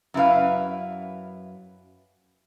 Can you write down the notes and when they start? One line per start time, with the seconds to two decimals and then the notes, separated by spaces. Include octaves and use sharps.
0.14 F#2 E4 B4 F5